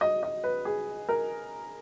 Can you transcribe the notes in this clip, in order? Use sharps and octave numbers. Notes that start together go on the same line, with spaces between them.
D#5
D#5
B4
G#4
A#4